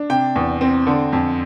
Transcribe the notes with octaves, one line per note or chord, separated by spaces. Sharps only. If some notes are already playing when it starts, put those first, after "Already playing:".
Already playing: D4
C3 G5
E2
C4
D3
F2